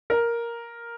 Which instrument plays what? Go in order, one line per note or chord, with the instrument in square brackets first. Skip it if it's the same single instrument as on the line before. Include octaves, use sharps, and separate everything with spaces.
[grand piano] A#4